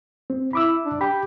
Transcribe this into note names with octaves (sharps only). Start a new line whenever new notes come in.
C4
E4 B5 D6 E6
D4
G4 G5 B5